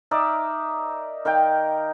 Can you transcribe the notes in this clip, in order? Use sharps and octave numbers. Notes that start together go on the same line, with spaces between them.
D#4 A#4 D5 E5
D#3 A#4 F5 G5